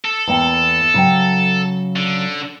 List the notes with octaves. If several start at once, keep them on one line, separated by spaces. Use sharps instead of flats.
A4
E2 A#3 G5
C#3 F#3 G5
D3